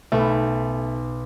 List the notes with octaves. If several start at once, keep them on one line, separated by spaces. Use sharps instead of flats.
B1 A3